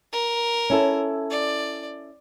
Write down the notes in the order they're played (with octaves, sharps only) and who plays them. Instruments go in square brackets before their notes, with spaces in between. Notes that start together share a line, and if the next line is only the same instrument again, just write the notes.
[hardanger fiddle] A#4
[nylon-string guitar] C#4 E4 A4
[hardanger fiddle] D5